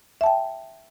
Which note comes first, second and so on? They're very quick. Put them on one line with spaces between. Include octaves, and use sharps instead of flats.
E5 A5 G5